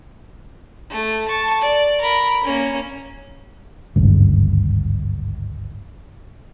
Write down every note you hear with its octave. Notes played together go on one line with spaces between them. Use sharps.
A3
A5 C#6
D5
A#4 B5
A#3 C#4
G#1 D2 G2 C#3